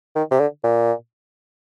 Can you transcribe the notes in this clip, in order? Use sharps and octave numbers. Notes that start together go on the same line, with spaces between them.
D#3
C3
D3
A#2